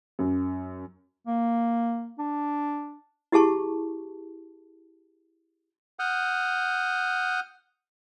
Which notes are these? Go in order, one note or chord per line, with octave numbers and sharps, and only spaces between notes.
F#2
A#3
D4
E4 G4 G#4 A5 C#6
F#5 D#6 F6 G6